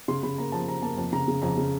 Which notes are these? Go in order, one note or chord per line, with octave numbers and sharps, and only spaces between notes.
C#3 C6
C#3 B5
A#3 A#5
F3 A5
F3 A#5
A#3 A5
F2 A5
C#3 A#5
C#3
F2 A#5
C#3